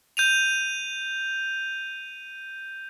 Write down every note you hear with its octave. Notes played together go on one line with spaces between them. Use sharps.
G6 D#7 F7